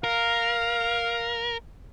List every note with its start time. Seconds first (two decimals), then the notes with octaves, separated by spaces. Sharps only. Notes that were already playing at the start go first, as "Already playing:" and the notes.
0.04 A#4 F5